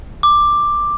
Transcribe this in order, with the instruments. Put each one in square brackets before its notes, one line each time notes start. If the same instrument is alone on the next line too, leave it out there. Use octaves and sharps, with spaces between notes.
[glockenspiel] D6